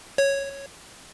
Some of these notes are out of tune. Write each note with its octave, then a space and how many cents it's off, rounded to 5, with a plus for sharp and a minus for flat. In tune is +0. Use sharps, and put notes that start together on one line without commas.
C#5 -5